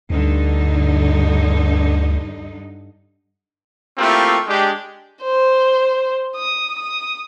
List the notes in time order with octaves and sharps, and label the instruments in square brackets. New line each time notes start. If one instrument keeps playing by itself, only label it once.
[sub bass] D2 [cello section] G2 D3 D#4
[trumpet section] A3 A#3 C4 E4 F4 G4
G#3 D4 G4
[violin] C5
D#6
D#6